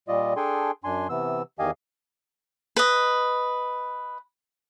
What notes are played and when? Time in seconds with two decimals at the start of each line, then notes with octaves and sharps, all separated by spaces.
0.08 A#2 G3 F4 D5 D#5
0.36 D4 G#4 A4 G5 G#5 C6
0.84 F#2 D4 G#5 C6
1.10 C3 E3 B3 E6
1.59 E2 D#3 G4 D#5 F5 G#5
2.77 B4 D#5